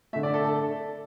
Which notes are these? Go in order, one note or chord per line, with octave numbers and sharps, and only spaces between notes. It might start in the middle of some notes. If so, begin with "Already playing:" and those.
D3 A3 E5
D5
A4
A4